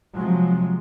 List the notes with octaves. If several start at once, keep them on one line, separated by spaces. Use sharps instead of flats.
C3 F3 F#3 G#3